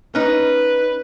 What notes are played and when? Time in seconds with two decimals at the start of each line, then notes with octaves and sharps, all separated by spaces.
0.15 C#4 D#4 B4